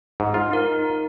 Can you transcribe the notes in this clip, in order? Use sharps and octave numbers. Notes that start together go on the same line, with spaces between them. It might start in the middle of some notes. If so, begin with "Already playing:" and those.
G#2
F4
D#4 A#4